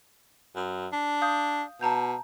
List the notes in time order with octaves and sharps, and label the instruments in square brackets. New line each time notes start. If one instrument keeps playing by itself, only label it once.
[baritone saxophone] F#2
D4
[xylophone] F5 D#6 G6
[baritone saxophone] B2 [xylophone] A5 A#5 G6